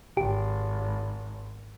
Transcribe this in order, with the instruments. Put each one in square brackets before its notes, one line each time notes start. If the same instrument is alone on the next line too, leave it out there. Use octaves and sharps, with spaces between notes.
[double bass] G#1 [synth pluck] G4